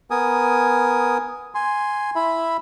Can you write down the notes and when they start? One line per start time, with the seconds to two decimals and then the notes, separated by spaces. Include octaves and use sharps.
0.11 B3 A#4 G#5 D#6
1.55 G#5 C6
2.16 E4 E5 B5